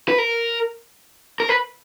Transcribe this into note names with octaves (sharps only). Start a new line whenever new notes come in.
B4
A#4
A#4
B4